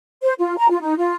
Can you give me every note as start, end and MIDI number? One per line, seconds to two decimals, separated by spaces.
0.22 0.33 72
0.39 0.56 65
0.58 0.68 82
0.70 0.80 65
0.82 0.94 63
0.98 1.16 65